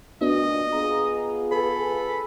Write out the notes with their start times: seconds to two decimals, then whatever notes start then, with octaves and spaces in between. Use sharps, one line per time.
0.21 D2 A#2 B3 D4 F#4 D#5
0.73 B3 F4 G#4 A#5
1.52 A4 B4 G#5 B5